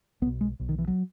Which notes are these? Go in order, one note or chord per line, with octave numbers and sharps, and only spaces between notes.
B1 B2 B3
G#3
B1 B2
D#3
E3
F#3